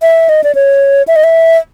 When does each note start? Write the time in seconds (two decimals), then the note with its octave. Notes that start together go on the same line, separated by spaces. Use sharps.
0.02 E5
0.29 D#5
0.44 D5
0.55 C#5
1.08 E5
1.16 D#5
1.24 E5